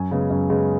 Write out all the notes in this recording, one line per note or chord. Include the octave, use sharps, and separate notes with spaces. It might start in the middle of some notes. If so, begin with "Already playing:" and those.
Already playing: F#2 G#5
C#3 G#3 B3
F#2
C#3 G#3 B3